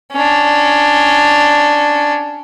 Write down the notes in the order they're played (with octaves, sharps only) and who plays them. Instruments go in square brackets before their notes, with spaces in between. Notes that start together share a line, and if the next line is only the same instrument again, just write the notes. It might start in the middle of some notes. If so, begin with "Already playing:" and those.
[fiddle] C#4 D4